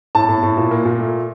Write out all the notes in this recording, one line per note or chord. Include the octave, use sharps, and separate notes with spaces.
A2 A5
A2
A2
A#2
A#3
A#2
A3